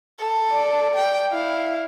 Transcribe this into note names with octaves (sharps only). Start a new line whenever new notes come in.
A4
D5
G5
E4 F5